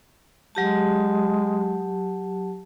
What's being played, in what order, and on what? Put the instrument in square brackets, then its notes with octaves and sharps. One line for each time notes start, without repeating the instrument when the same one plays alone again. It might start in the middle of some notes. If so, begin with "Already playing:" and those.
[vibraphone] F#3 G4 A5 [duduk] G#3